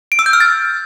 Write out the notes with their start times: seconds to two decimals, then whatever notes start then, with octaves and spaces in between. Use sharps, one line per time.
0.12 D7
0.19 E6
0.26 G6
0.33 F6
0.40 A6